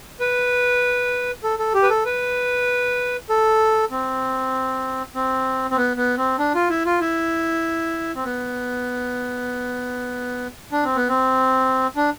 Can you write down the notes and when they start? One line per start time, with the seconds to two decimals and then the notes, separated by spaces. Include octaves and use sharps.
0.20 B4
1.43 A4
1.59 A4
1.74 G4
1.83 B4
1.90 A4
2.05 B4
3.29 A4
3.91 C4
5.15 C4
5.70 C4
5.77 B3
5.97 B3
6.18 C4
6.39 D4
6.55 F4
6.69 E4
6.86 F4
7.01 E4
8.15 C4
8.25 B3
10.72 D4
10.84 C4
10.96 B3
11.09 C4
11.96 D4